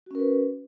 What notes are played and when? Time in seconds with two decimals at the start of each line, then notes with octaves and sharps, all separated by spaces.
0.06 F#4
0.11 C#4
0.15 A#4
0.19 B4